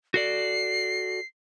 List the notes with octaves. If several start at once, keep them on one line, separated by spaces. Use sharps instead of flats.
F#4 A4 D5 C7